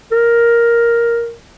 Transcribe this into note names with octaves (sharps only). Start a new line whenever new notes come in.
A#4